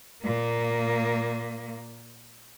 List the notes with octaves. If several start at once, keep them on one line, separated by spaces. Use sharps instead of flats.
A#2 A#3